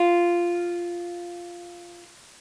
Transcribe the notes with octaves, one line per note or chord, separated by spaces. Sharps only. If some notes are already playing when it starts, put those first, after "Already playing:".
Already playing: F4